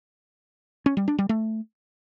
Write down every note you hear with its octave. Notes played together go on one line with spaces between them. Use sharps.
C#4
G3
D4
G3
A3